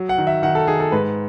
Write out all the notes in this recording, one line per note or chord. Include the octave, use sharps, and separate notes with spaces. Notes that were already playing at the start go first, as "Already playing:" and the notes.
Already playing: F#3
F#5
D#3
E5
D#3 F#5
A4
D#3 G#4
A4
G#2 B4